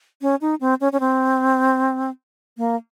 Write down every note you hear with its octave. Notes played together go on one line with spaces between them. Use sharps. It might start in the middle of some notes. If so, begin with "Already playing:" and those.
C#4
D#4
C4
C#4
C#4
C4
A#3